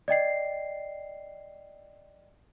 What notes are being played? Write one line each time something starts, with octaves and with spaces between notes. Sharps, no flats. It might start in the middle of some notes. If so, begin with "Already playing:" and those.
D5 D#5 G5 C7